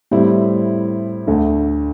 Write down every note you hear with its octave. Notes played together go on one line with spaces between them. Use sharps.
A2 G3 C4 E4
D2 D3 A3